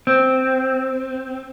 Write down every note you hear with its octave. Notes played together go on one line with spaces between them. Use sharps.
C4